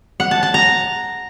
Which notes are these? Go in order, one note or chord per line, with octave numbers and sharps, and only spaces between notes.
F#5
A5
A5
A#5